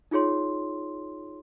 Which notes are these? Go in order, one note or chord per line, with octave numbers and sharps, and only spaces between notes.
D#4 F4 G#4 C#5 C6